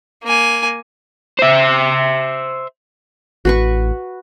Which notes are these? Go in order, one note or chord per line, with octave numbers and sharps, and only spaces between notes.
A#3 G#5
C5 E5
A1 F#4 B4 C#6